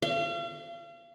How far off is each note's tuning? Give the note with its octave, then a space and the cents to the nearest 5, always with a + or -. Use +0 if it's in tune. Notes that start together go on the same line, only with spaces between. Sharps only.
F5 -40